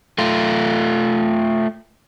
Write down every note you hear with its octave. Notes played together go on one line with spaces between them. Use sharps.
A3 F4